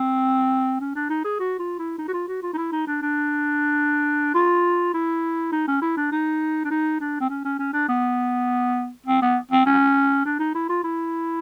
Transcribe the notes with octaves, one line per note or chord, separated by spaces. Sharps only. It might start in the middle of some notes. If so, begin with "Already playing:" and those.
Already playing: C4
C#4
D4
D#4
G#4
F#4
F4
E4
D#4
F#4
F4
F#4
F4
D#4
E4
D#4
D4
D4
F4
E4
D#4
C#4
E4
D4
D#4
D4
D#4
D4
C4
C#4
C#4
C#4
D4
B3
C4
B3
C4
C#4
D4
D#4
E4
F4
E4